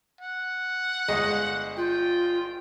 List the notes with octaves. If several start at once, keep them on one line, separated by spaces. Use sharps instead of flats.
F#5
G1 G#3 D#5
F4 G5